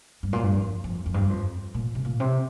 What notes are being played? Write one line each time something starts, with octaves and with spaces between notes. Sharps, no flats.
G2
A#2
G2
F2
F2
F2
G2
F2
A#2
C3
A#2
C3